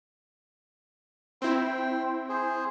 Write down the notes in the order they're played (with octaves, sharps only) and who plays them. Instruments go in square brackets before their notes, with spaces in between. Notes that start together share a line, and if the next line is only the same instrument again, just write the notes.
[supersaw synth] C4 E4 [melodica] C5 G5
[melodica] G#4 C5